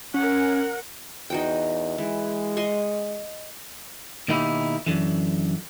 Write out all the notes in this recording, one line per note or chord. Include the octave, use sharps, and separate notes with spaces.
C#4 A#4 F#5
E2 D#4 F#4 G5
E3 G#3
D#5 C6 C#6
B2 D#3 A#3 D#4 E4 G4
F#2 B2 D3 E3